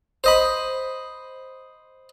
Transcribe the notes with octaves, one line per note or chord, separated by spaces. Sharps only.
C5 D#5 B5